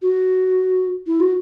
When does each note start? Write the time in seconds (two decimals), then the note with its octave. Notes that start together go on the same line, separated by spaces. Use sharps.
0.02 F#4
1.07 E4
1.20 F#4